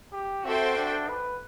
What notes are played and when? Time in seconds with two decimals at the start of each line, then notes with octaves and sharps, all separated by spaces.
0.13 G4
0.45 C4 F#4 A4 C5 E5 G5
0.77 D4
1.09 B4